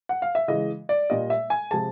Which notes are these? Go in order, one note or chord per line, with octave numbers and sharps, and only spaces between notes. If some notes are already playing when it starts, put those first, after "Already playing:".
F#5
F5
E5
C#3 E3 G#3 D#5
D5
A#2 G3 D#5
E5
G#5
C3 F3 G#3 A5